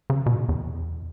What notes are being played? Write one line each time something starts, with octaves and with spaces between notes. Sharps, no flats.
C#3
B2
G#2
A#2
E2